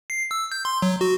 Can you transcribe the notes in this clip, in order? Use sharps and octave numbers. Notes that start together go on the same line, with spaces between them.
C7
E6
G6
C6
F#3
F#4